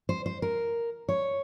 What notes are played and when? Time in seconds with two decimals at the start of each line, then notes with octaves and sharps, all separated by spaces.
0.09 C5
0.26 C5
0.42 A#4
1.09 C#5